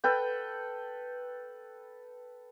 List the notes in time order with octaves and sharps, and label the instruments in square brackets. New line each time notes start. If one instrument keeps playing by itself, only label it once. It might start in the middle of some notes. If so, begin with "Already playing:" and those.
[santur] A4 B4 G5